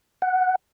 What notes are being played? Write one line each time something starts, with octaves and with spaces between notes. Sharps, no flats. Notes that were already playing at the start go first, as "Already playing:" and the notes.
F#5